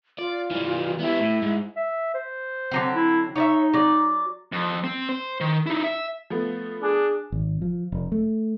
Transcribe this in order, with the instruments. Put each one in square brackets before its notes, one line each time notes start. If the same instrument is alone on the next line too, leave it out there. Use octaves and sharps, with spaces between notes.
[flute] F4 [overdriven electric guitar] D5
[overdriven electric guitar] E3 G3
[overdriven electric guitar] B3 G4 [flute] E4
[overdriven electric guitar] A2
G#2
[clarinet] E5
C5
[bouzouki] D3 F#3 C4
[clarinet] E4
[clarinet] D#4 [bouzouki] C#5 D5 E5
[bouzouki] F#3 D5
[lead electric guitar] F2
C4
C5
D#3
D#4 E4
E5
[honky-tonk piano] F3 A3 B3
[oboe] D4 [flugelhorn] G#4
[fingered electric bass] G#1
F3
F1
A3